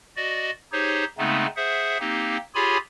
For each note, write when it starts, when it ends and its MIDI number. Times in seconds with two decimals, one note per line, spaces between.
0.17 0.51 66
0.17 0.51 74
0.17 0.51 75
0.72 1.04 63
0.72 1.04 67
0.72 1.04 68
0.72 1.04 72
0.72 1.04 73
1.18 1.46 49
1.18 1.46 56
1.18 1.46 57
1.18 1.46 59
1.18 1.46 60
1.18 1.46 63
1.57 1.98 68
1.57 1.98 72
1.57 1.98 76
1.57 1.98 78
2.00 2.37 58
2.00 2.37 60
2.00 2.37 63
2.00 2.37 67
2.55 2.77 65
2.55 2.77 67
2.55 2.77 68
2.55 2.77 73
2.55 2.77 80
2.55 2.77 83